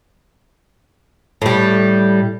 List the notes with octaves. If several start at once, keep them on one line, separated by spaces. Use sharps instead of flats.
A2 G3